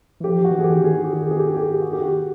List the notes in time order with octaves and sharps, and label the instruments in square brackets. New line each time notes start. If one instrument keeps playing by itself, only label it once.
[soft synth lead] E3
[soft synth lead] F3 [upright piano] G4
[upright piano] F#4
[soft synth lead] E3
[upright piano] G#4
G4
[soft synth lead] E3
D#3
[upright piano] G#4
G4
G#4
G4
G#4
G4
G#4
G4
F#4
G4
F#4